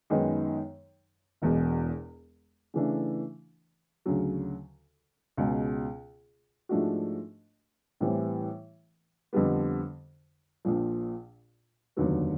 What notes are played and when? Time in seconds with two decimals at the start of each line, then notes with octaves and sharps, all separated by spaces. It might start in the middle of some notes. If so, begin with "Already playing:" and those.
0.10 F#2 D#3 G#3 B3 D#4
1.42 E1 E2 B2 G#3
2.74 C#3 E3 A3 D4
4.06 D2 C#3 F#3
5.37 C#2 B2 G#3
6.69 G#2 F3 A3 D4 F#4
8.01 A2 E3 G3 C4
9.33 F2 D3 G3 B3
10.65 A#1 A#2 F3
11.97 F1 D#2 D3 F#3 B3